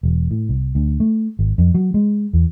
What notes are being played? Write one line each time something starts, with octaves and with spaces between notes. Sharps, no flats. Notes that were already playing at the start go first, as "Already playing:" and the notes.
E1
A2
C2
D2
A3
G#1
F2
F#3
G#3
E2